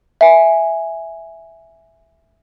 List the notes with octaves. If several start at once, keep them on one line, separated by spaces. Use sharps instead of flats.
E5 G#5